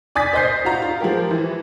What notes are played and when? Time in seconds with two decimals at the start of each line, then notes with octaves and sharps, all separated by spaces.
0.15 D5 G#5 D#6 A6 B6
0.33 C5 D#5 G6 C7
0.65 F4 F#4 A#5
0.82 F4
1.00 F3 G#3 G4 A#4
1.31 E3